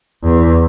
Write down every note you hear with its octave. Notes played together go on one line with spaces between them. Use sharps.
E2